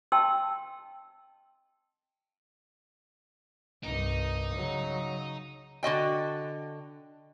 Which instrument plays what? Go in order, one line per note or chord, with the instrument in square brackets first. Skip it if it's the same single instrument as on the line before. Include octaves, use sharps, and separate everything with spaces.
[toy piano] D#5 G5 A5 C6 E6
[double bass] C2 G2 [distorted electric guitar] D#4
[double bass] C#3 F#3
[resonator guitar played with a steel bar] D3 F#4 D#5 G5